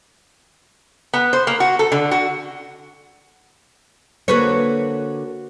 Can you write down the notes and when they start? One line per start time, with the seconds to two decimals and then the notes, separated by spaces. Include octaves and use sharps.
1.13 B3
1.33 C5
1.47 A#3
1.60 F#4
1.79 A4
1.92 D3
2.11 F#4
4.28 D3 A#3 F#4 A4 B4 C#5